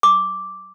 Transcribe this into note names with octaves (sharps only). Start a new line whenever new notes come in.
D6